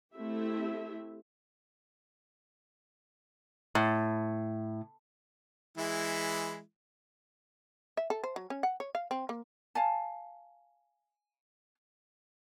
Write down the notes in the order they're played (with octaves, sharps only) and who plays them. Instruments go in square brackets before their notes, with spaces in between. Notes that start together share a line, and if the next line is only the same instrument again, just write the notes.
[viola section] A3 C4 E4 G4 E5
[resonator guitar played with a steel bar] A2
[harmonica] E3 G#3 E4
[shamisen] E5
A4
C5
F#3
C#4
F#5
C#5
F5
C4
A#3
[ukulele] F5 G#5 A5